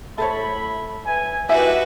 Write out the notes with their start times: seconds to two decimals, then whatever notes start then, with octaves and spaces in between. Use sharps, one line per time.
0.18 A2 A4 C5 C#5 E5 B5
1.06 B4 E5 G#5
1.49 A#3 D#4 E4 F#4 G4 B4 E5 G#5